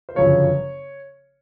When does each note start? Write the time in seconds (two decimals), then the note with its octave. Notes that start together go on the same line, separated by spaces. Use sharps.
0.09 C5
0.15 G1 F#2 C#3 F3 C#5